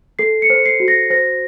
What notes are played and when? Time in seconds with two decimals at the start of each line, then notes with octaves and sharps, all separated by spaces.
0.19 A4 C7
0.42 C#7
0.50 C5
0.65 C7
0.80 F#4
0.88 A#6
1.10 C5 A#6